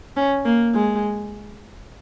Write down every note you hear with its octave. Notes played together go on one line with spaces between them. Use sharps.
C#4
A#3
G#3